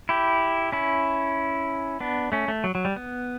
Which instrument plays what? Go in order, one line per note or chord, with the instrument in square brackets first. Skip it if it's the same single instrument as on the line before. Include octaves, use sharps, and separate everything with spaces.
[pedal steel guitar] E4 G4
C#4 E4
B3 D4
A3 C#4
A3
F#3
F#3
G3
B3